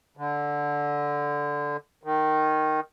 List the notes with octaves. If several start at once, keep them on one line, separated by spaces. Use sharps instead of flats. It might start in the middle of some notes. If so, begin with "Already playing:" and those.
D3
D#3